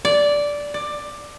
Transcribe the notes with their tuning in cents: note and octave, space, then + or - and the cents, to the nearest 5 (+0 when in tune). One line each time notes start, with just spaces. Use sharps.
D5 -10
D5 +15